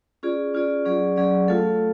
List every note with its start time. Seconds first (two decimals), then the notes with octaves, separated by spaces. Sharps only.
0.23 C#4 F4 G#4 D5
0.54 C#4 F4 G#4 D5
0.85 F#3 C#4 G#4 D5
1.16 F#3 C#4 G#4 D5
1.48 A3 F4 A4 F5